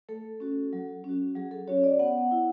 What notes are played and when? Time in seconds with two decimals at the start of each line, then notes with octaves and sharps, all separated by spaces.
0.09 A3 A4
0.40 C#4 F#4
0.73 F#3
1.04 C#4 F#4
1.35 F#3 G#4
1.51 A4
1.68 C#4 F#4 C#5
1.84 D5
1.99 B3 F#5
2.31 E4